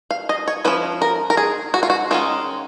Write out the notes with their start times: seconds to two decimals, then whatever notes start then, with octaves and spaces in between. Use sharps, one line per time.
0.11 F5
0.29 D#5
0.48 C#5
0.65 F3 A#3 C#4 B4
1.02 A#4
1.30 A#4
1.37 G#4
1.74 F#4
1.83 F4
1.90 F#4
2.11 D#3 G#3 C#4 F4